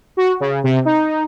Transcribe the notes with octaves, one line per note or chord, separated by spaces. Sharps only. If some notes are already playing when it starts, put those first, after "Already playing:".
F#4
C#3
C3
D#4